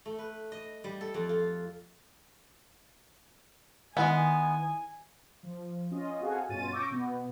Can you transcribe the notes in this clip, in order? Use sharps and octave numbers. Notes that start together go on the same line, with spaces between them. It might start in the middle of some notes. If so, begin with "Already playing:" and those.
A3
B4
D#5
G3
A4
F2
F4
D#3 G#3 B3 E4 G#5
F3
C#4 F4 D#5
C4 F#4 G#4 A4 F5 G#5
G2 B2 C#4 F4 A6 D#7
C#6 D6 E6 G6 A#6
B2 B3